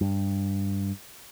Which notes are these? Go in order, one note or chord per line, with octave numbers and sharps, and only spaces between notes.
G2